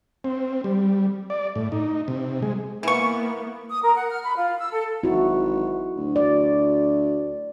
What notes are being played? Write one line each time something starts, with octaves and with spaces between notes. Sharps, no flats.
C4
G3
D5
A2
D#4
C3
G#3
E3 A#3 B3 C#6
D#6
A#4
F#5
F6
B5
F4
E6
A4
G#1 E4 F#4
D2
D5